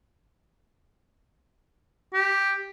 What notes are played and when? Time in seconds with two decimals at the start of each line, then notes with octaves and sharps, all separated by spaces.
2.14 G4